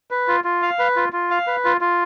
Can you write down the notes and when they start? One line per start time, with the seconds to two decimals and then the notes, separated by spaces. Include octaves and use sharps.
0.11 B4
0.28 F4
0.44 F4
0.62 F5
0.79 B4
0.96 F4
1.13 F4
1.31 F5
1.47 B4
1.65 F4
1.81 F4